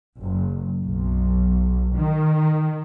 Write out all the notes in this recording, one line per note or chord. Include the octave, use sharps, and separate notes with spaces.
F#1
B1
D#3